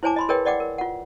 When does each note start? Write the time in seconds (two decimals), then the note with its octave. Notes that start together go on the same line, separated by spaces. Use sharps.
0.03 E4 C5 C#5 G#5 A5 D6
0.16 D#5 B5 C6
0.29 G#4 A#4 B4 C#5 D#5 G5
0.45 D5 D#5 F#5 G5 D6
0.60 A#4
0.78 F4 F#5